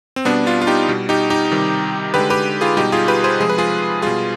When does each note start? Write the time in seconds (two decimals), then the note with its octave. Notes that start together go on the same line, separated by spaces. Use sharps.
0.16 C4
0.25 B2 G3 B3 D4
0.46 D4 F4
0.62 F4
0.67 D#4 G4
0.89 B2 G3
1.09 D#4 G4
1.30 D#4 G4
1.51 C3 D#3 G3
2.14 D3 G#3 G4 B4
2.30 G4 B4
2.61 F4 G#4
2.77 B2 G3 D#4 G4
2.92 F4 G#4
3.08 G4 B4
3.24 G#4 C5
3.40 C3 F3 G#3 G#4
3.49 B4
3.58 F4 G#4
4.02 B2 G3 F4 G#4